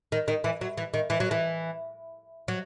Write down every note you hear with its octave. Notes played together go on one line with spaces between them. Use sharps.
D#3
D#3
E3
F#3
E3
D#3
E3
F#3
E3
F#3